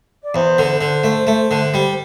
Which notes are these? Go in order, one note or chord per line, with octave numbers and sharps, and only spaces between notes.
D5
E2 C5
D3
C5
D3
A3
A3
D3
G3